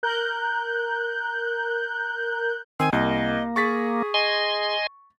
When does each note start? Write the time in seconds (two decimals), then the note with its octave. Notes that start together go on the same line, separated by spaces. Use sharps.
0.03 A#4 F#6 G6
2.80 D#3 C4 G#5
2.93 C2 A#3 D#5
3.56 G#4 C#6 A6 B6
4.14 D#5 G#5 C6